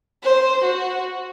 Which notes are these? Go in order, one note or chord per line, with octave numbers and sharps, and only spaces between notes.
C5
F#4